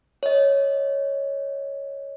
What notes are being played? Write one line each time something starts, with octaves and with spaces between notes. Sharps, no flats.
C#5 D#5